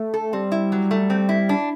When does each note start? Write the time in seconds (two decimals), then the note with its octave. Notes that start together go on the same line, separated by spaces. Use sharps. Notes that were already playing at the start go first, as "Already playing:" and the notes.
Already playing: A3
0.14 A4
0.33 G3 C4
0.52 E4
0.72 F#3
0.91 A3
1.10 C4
1.29 E4
1.49 D4